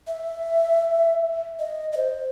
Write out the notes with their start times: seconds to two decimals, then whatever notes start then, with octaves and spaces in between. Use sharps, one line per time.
0.07 E5
1.59 D#5
1.92 D#5
1.97 C5